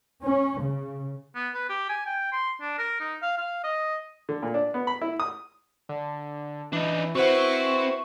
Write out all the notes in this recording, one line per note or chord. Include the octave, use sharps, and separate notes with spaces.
C#4
C#3
B3
B4
G4
G#5
G5
C6
D4
A#4
D#4
F5
F5
D#5
D3
A#2
D4
B3
B5
E4
D#6
D3
E3 D4 D#4
C4 E4 F#4 B4 C5 F#5 C#6